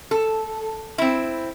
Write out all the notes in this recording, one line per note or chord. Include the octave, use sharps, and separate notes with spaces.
A4
C4 E4